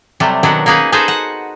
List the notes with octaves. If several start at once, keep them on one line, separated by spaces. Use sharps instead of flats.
C3 F#3 G3 A3
B2 D#3 F#3 D4 B4
A#3 C#4 D#4 G#4 B4
D#4 F#4 G#4 A4 B4 C5
F#5